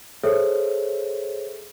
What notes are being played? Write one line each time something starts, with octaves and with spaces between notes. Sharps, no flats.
G#4 A4 C5 C#5 E5